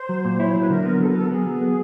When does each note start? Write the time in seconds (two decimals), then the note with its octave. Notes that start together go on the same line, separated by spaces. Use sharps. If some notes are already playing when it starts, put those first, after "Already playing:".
Already playing: C5
0.09 F#3
0.25 A#2
0.40 E4 C#5
0.51 F#3 C5
0.60 B4
0.70 D3 A#4
0.85 B3
1.00 F#3 A4
1.09 A#4
1.15 B3 A4
1.31 B3 G#4
1.47 F#3
1.61 B3